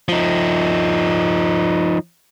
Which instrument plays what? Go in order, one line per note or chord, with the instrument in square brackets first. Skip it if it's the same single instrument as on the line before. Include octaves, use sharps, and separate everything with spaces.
[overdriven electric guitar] F3 D#4